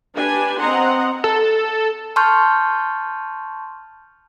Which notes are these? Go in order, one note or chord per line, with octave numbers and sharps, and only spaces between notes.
D4 G4 B4 G#5
C4 D#5 F#5 A#5 C6
A4
A5 C6 C#6 F6 G6